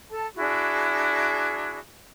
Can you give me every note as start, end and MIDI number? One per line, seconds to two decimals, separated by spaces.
0.10 0.26 69
0.10 0.26 81
0.37 1.79 62
0.37 1.79 64
0.37 1.79 66
0.37 1.79 68